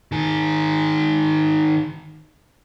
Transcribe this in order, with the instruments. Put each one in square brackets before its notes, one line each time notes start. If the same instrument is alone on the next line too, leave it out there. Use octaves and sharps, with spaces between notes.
[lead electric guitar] D#3 G#4